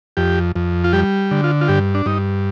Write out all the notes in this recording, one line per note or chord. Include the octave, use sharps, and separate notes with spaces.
F2 G4
F2
F4
G3 G4
D3
F4
F4
G2 G4
D4
G2 D#4